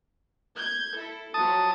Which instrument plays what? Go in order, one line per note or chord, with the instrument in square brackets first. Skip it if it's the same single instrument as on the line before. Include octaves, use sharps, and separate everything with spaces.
[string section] G6 G#6
E4 A4
[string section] F3 F#3 [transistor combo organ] A5 D#6